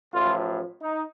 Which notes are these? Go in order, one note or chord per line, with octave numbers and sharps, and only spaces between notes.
A1 A2 F3 F4
D#4